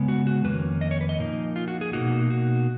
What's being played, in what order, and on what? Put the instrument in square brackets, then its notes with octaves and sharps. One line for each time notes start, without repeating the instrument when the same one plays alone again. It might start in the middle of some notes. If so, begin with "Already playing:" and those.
Already playing: [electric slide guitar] C#3 G#3 B3
F#4
F#4
F2 D#3 A#3 C#4 B4
D#5
C#5
B4
D#5
A#2 F3 A#3 D#4
F4
F#4
G#4
B2 A#3 D#4 F#4
F#4